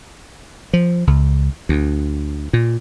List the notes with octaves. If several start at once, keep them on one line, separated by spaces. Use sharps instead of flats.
F3
C#2
D2
A#2